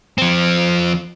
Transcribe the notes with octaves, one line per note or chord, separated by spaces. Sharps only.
F3 C4